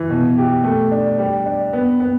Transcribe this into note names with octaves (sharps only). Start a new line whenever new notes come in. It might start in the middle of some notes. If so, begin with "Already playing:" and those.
Already playing: E3
B2
G4
A3
D4
G3
D4
B3
B3